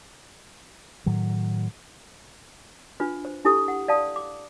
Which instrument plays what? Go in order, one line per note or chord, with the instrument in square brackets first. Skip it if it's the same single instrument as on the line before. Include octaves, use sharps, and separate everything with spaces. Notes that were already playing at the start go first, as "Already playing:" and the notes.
[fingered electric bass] A2 D#3 F#3
[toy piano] D4 F4 B4
C5
D4 E4 G4 A4 D#6
F#5
D5 F5 A5 D#6
D6